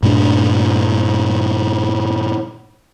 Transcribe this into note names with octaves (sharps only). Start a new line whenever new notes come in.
G2 A#2 A3 D4